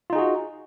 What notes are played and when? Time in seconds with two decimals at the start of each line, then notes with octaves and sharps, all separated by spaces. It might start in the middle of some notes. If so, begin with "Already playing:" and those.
0.10 F4
0.13 D#4
0.15 G#4
0.18 F#4